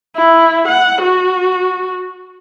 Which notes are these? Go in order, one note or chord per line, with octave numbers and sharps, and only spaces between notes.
E4
F#5
F#4